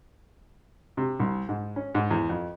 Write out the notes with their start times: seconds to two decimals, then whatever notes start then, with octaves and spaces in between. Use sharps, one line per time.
0.97 C3
1.20 C2
1.49 G#2
1.76 C#4
1.95 G#2
2.11 E2
2.29 F2